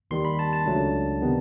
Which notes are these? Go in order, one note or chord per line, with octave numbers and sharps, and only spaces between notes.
D#2 D#3 G3 C6
B5
A5
A5
C#2 C#3 F#3 A3 D4
C3 D#3 G3 B3